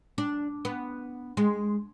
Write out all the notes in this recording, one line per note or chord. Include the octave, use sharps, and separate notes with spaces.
D4
B3
G#3